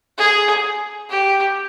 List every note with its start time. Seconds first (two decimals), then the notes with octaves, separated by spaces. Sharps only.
0.18 G#4
1.10 G4